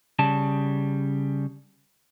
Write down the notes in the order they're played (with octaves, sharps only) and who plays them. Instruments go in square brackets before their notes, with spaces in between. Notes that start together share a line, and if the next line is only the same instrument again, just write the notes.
[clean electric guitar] C#3 G3 A5